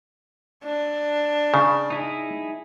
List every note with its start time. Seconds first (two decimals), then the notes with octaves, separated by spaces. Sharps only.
0.64 D4
1.54 C#3
1.90 D#4 E4 G#4